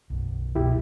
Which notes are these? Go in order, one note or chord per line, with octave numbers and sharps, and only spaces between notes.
B1 F#2
F1 C2 B2 F#3 E4 G4